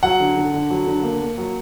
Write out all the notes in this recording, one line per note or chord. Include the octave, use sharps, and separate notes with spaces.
F#3 F#5
D3
D3
D3
F#3
D3
A#3
A#3
F#3